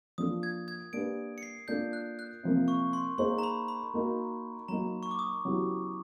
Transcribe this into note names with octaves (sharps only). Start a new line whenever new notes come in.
F3 A#3 D4 F4 A4 D#6
G#6
G#6
A#3 D4 G4 B4 D7
C#7
C7
A#3 D4 F4 A4 G6
F#6
F#6
C3 F3 A#3
C#6
C6
A#3 D#4 G#4 C5 C6
A#5
B5
B5
A#3 D#4 F#4 A#4
F#3 A#3 D#4 A#5
C#6
D6
D#6
C#3 F#3 B3 E4 G4